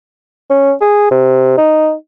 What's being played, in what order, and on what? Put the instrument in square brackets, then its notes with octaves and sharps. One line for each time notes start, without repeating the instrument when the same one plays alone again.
[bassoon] C#4
G#4
C3
D#4